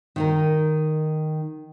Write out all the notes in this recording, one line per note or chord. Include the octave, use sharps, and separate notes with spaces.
D#3 D#4 A#4